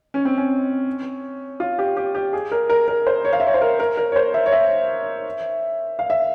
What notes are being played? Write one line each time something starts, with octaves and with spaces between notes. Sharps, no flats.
C#4
C4
C#4
F4
G4
G4
G4
G#4
A#4
A#4
A#4
C5
C#5
F5
E5
C#5
C5
A#4
A#4
A#4
C#5
C5
E5
C#5
E5
F5
E5